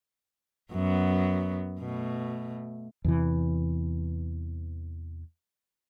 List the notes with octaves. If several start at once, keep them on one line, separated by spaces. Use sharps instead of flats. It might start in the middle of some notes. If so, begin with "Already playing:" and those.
F#2 F#3 B3
B2 A3
E2 C3 E3